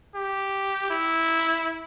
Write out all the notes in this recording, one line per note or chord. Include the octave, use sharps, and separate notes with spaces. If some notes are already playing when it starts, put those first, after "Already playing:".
G4
E4